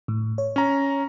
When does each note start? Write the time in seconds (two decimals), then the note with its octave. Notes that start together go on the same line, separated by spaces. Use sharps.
0.08 A2
0.38 C#5
0.56 C#4 A#5